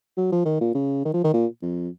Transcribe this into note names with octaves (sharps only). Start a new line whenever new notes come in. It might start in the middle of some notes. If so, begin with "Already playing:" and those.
F#3
F3
D#3
A#2
C#3
D#3
F3
D#3
A#2
F2